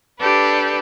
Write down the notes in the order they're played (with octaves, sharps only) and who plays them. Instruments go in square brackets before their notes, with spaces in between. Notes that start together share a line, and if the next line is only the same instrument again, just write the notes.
[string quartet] D4 G4 A4 B4